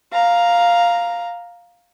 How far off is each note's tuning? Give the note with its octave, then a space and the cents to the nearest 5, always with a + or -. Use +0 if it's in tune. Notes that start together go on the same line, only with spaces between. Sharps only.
F5 +0 A#5 +0